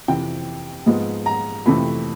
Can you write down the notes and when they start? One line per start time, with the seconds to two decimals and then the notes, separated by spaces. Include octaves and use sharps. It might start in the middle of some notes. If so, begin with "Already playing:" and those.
0.08 F2 C3 E3 G5
0.86 G#2 F3 G#3 B3
1.26 A#5
1.66 F2 C3 E3 A3 B5